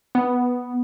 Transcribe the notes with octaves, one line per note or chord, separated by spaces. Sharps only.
B3